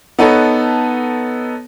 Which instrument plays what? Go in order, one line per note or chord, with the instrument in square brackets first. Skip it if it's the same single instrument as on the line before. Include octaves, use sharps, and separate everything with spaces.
[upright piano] B3 D#4 A4 B4 C#5 A5